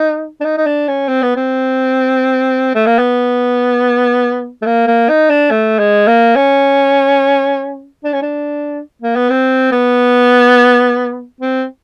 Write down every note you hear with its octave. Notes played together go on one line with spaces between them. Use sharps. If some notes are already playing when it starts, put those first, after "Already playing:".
Already playing: D#4
D4
D#4
D#4
D4
C#4
C4
B3
C4
A3
A#3
B3
A3
A#3
A#3
D#4
D4
A3
G#3
A#3
C#4
D4
C#4
D4
A#3
B3
C4
B3
C4